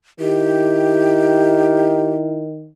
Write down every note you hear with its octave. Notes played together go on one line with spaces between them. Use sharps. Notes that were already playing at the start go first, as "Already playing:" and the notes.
D#3 E4 G4